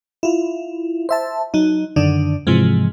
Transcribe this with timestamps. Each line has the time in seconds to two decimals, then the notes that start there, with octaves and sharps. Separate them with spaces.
0.23 E4 F4
1.09 C5 E5 A5
1.54 F#3 D#4
1.96 F#2 D3 D#3 D4
2.47 G#2 C3 E3 F3 G#3